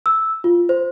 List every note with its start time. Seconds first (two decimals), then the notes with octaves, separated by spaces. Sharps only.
0.06 E6
0.44 F4
0.69 C5